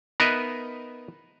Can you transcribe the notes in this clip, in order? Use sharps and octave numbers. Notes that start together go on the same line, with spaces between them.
B3 D#4 A#4 B4 D#5 E5